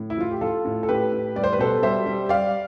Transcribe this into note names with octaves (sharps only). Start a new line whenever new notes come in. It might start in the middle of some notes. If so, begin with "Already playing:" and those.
Already playing: A2
E4
F3 F4
G4
F3 F4 A4
A2
A4
A2 G4 B4
A2
G3 D5
C5
B4
B2 A4 C5
G3 C5 E5
G3
G3 D5 F5